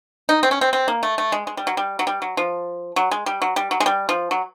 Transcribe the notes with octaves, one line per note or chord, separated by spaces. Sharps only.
D#4
C4
C#4
C4
C4
A#3
A3
A3
G#3
G#3
G3
F#3
G3
F#3
G3
F#3
F3
F#3
G#3
G3
F#3
G3
F#3
G#3
G3
F3
F#3